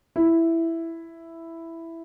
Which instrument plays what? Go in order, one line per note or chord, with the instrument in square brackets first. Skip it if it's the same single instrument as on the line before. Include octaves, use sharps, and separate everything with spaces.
[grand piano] E4